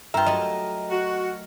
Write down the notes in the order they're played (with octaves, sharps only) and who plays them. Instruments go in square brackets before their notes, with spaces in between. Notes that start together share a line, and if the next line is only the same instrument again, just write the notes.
[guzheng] G2 F4 [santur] A#4 [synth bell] E5 G5
[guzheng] F#3 A3 [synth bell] D#5
[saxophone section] F#4